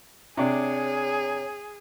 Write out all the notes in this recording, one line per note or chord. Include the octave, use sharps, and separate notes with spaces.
C3 D4 G#4 C#5